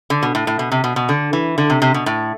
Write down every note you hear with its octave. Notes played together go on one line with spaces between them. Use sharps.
D3
B2
A2
A2
B2
C3
B2
B2
D3
E3
D3
C3
C3
B2
A2